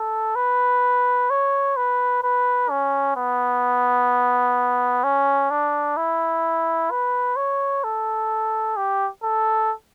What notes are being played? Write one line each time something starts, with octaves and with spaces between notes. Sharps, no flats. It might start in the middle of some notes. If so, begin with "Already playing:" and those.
Already playing: A4
B4
C#5
B4
B4
C#4
B3
C#4
D4
E4
B4
C#5
A4
G4
A4